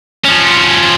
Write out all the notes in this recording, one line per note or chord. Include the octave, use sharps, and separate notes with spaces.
F3 C#4